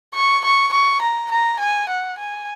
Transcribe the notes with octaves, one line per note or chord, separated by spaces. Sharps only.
C#6
C#6
C#6
A#5
A#5
G#5
F#5
G#5